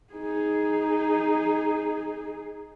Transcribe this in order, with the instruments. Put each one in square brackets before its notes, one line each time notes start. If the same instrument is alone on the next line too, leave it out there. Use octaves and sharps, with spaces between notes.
[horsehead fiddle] D#4 G#4